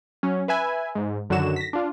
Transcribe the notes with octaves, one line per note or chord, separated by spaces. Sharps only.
F#3 C#4
B4 E5 G#5 B5
G#2
F#2 D3 D#3 F#3 F#4 E7
A#6 B6
D4 F4